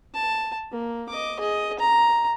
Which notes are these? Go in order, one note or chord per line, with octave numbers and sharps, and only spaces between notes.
A5
A#3
D#5 D6
G#4 D#5
A#5